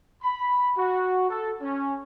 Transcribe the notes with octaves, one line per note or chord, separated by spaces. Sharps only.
B5
F#4
A4
C#4